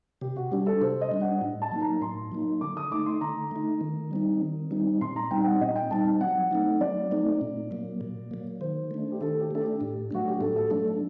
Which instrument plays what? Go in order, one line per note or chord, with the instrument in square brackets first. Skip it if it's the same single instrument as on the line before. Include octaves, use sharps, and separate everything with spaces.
[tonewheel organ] C3 [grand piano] G4
[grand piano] F#4
[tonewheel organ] G3 D4 [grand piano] G4
[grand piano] A4
[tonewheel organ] C3 [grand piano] C5
[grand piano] D#5
[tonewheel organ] G3 D4
[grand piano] F#5
[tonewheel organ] A2
[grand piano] A5
[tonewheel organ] F#3 A#3 D#4
[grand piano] A#5
[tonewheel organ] A2 [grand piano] C6
[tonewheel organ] F#3 A#3 D#4
[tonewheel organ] D3 [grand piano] D6
[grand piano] D#6
[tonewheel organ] A3 D#4 [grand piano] D6
[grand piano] C6
[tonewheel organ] D3 [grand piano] A#5
[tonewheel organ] A3 D#4
D#3
G3 C4 D#4
D#3
G3 C4 D#4
[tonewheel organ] A#2 [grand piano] C6
[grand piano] A#5
[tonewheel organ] G3 C4 D#4 [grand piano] G5
[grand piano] G5
F#5
[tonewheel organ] A#2 [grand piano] D#5
[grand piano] G5
[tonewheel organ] G3 C4 D#4 [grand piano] A5
[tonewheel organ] F#3 [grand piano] F#5
[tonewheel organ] A3 C4 D#4
[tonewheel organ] F#3 [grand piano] D5
[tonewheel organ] A3 C4 D#4
A#2
F#3 A#3
A#2
F#3 A#3
[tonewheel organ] D#3 [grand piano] C5
[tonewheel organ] A3 D4
[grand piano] G4
[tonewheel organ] D#3 [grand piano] A4
[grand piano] G4
[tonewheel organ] A3 D4 [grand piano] A4
[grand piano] G4
[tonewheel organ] A2
[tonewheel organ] F#3 A3 D4 [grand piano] F#4
[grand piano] G4
[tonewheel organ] A2 [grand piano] A4
[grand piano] A4
[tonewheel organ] F#3 A3 D4 [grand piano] A4